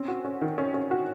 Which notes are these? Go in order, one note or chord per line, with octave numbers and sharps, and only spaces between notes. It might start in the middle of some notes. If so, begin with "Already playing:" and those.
Already playing: C4 C#4
F#4
C#4
D#3
C#4
C#4
F#4